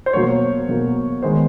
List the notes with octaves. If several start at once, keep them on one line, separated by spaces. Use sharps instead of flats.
C5
B2 F#3 A#3 C#5
B2 F#3 A#3
D#3 G#3 B3 C5